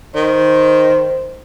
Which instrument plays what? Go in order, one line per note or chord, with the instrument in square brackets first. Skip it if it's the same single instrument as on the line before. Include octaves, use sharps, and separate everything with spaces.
[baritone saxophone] D#3 [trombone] C5